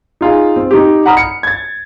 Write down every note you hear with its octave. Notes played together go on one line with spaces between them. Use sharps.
D#4 F4 G#4
C4
D#4 G4
F#5 A#5 B5 D#6 F6
C#7
G#6 A6